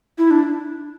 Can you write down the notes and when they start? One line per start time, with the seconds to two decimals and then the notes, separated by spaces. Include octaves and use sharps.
0.18 E4
0.30 D4